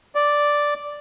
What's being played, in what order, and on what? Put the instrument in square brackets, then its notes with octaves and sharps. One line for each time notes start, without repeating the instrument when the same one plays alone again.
[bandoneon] D5